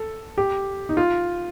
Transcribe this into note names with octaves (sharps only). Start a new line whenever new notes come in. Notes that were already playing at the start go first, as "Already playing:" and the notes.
Already playing: A4
G4
D#4
F4